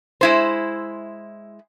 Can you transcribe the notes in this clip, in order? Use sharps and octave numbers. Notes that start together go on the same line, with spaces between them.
G#3 E4 C5